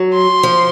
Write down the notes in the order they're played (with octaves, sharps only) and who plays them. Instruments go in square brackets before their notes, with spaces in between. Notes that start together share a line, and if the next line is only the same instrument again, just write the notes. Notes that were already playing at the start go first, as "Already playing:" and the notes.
Already playing: [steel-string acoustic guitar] F#3
[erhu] C6
[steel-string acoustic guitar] F3